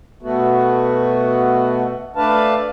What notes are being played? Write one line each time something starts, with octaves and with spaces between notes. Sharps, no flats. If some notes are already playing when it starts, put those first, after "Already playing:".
B2 A3 B3 F#4
A3 D4 B4 F5 A5